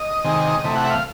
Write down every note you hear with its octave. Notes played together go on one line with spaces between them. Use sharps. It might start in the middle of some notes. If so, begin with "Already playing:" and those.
Already playing: D#5
C3 D#3 G#3
C3 E3 A3
F#5
E5
F5